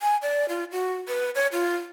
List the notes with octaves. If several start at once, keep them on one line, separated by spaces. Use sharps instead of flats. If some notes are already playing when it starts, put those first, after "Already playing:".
G#5
D5
F4
F#4
B4
C#5
F4